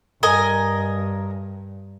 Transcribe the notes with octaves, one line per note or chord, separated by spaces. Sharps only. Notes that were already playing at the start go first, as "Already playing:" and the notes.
G2 A#4 D#5 G#5